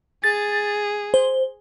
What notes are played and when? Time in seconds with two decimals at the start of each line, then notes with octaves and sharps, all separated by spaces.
0.24 G#4 A6
1.14 C5